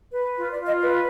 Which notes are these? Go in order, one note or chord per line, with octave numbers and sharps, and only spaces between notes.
B4
F4
D5
F4
D#5
B4